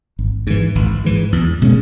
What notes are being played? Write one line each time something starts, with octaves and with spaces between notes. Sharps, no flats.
G#1
G#2 E3
G#1
G#2 E3
E2
B2 G#3 C#4